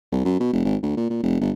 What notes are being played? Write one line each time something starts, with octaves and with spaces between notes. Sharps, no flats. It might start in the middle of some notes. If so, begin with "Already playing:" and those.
C2
F#2
B2
F1
G#1
D2
A#2
A#2
F1
G1